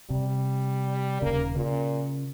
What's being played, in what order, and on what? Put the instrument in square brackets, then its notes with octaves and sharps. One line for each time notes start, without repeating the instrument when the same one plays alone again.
[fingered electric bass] C3 [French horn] G3
[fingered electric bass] D#1 C#3 [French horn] A#3
[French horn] A#2 [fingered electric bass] C#3